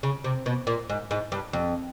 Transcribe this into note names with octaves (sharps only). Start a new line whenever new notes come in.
C#3
C3
B2
A#2
G#2
G#2
G2
F2